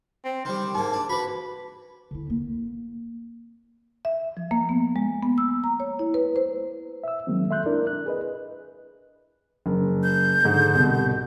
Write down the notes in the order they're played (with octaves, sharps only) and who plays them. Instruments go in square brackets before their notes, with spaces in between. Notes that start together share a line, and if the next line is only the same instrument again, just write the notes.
[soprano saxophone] C4
[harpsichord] D#3 G3 [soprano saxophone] C5
[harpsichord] G#2 A#3 [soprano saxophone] A5
[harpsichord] D4
[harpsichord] F#4 B4 [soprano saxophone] B5
[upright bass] D3 E4
A#3 C4
[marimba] E5
F3
A#3
B3
G#3
B3
E6
A#5
C#5
E4
B4
C5
[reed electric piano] E5 E6
D#3 F#3 G#3 A#3 C4
A4 E5 C6 F#6 G6
D4 E4 A#4 D5
F#6
G#4 B4 D#5
[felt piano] F#1
[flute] G6
[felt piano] G#2 D3
C2 B2